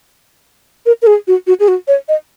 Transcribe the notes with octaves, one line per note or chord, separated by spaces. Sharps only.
A#4
A#4
G#4
F#4
F#4
G#4
F#4
C#5
D#5